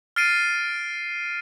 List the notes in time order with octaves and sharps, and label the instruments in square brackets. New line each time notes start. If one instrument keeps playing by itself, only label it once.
[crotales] F6 A6 C7 D7 D#7